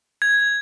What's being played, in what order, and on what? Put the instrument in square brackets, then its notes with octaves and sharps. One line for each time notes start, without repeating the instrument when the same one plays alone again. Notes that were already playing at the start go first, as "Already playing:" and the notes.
[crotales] G#6